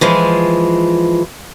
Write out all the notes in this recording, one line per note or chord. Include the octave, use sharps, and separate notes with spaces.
E3 F3 G#3